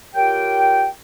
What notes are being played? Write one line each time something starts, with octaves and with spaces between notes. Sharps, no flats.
F4 G4 A#4 C#5 G5